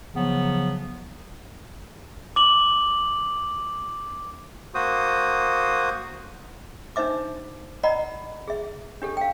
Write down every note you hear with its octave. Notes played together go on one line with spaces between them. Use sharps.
C#3 F3 F#3 B3
D6 F#7
A#3 F#4 C5 D#6
D4 D#4 C5 E5 D6
D5 D#5 F#5 A#5 B5
G#4 E5
D4 G4 A4
F5 G5